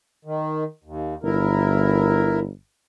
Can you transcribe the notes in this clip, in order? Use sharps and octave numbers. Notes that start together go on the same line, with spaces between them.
D#3
D#2
G1 E4 A#4